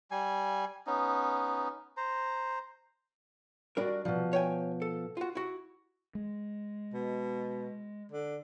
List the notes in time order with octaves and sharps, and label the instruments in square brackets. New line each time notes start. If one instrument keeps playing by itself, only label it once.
[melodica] G3 G#5
B3 C#4 D#4
C5 A#5
[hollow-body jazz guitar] G3 D4 A#4 [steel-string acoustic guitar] F#4 D5 D#5
[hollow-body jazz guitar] C2 [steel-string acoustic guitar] B2 F3
[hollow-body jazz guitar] C#5 G5 G#5
A4
F4 F#4
E4 F#4
[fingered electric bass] G#3
[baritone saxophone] B2
D3